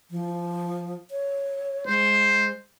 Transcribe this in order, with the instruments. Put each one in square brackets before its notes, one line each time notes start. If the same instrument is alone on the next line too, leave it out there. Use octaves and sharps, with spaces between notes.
[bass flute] F3
C#5
[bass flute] G#3 [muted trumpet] C5